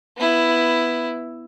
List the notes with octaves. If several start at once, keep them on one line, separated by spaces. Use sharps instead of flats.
B3 E4